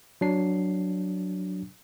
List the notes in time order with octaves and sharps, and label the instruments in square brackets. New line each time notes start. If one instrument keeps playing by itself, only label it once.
[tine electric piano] F#3 D4 C7